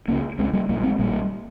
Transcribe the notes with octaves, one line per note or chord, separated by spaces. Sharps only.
C#2 C#3 A#3 C#4
C#2 C#3 G#3 C4
G3 A#3
A#1 A#2 G3 A#3
G#3 C4
A#1 A#2 G3 A#3